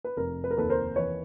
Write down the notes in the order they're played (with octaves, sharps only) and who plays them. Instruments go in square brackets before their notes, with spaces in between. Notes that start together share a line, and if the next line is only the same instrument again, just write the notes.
[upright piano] B4
F1 A#4
B4
A#4
D#2 A4 B4
A#4 C5
E3 B4 C#5